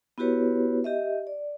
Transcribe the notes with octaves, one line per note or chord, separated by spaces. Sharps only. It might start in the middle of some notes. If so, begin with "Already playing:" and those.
B3 E4 F#4 G4 B4 C#5
G4 D#5 E5
D5